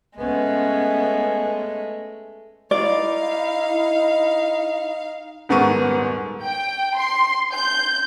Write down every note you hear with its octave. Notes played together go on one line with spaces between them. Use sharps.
G#3 A3 B3 C#4
D#4 E4 D5 F5
D#1 G#2 B3 A#4 C#6 D#7
G5
C6
G6